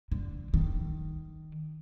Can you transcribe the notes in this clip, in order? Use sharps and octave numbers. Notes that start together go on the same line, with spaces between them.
D3
D#3